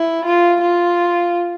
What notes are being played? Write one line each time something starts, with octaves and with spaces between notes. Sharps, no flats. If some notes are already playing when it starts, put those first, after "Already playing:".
Already playing: E4
F4
F4